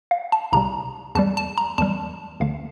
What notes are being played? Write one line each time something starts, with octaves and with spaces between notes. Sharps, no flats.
F5
A5
C2 C3 G3 A#5
E2 E3 G3 A5
A5
A#5
E2 E3 G3 A5
D2 D3 A3 F5